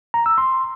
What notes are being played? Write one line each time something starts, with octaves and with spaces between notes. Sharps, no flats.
A#5
E6
C6